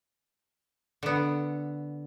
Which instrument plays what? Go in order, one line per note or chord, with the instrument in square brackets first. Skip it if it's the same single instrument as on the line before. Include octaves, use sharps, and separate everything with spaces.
[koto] D3 B3